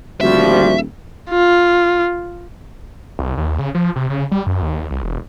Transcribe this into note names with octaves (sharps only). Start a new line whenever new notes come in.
D#1 D2 F3 G3 F#4 E5
F4
C2
D#2
C#3
F3
C3
C#3
G3
F#2
D#2
C2
E1